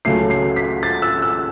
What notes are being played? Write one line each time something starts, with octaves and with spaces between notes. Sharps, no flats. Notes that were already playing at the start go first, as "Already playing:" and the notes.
C#2 C#3 F#3 A3 C#4 C7
C7
B6
A6
E6
E6